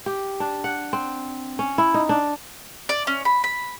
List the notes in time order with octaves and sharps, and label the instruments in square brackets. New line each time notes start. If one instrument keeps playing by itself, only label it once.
[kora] G4
D4
F#5
C4
C#4
E4
D#4
D4
[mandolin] D5
C#4
B5
B5